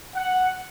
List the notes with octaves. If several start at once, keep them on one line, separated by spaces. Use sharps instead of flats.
F#5